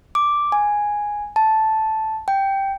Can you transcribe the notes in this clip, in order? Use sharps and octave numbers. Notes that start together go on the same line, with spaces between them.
D6
G#5
A5
G5